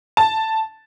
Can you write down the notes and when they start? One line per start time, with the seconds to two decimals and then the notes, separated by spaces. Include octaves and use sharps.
0.17 A5